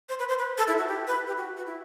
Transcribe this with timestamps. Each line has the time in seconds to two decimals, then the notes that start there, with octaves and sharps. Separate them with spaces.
0.09 C5
0.19 B4
0.29 C5
0.39 B4
0.58 A4
0.68 E4
0.78 F#4
0.88 G4
1.07 B4
1.27 G4
1.37 F#4
1.57 F#4
1.66 E4